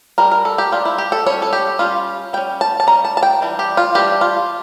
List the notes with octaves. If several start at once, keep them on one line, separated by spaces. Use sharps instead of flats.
G3 D4 A#4
A#4
A4
G4
G3 D4 F4
E4
G4
A4
G3 C#4 C#5
A4
G4
G3 C#4 F4
G3 C#4 G5
A5
A5
G3 C#4 A#5
A5
A5
G5
E3 G3 D4
G4
F4
E3 G3 D4 G4
F4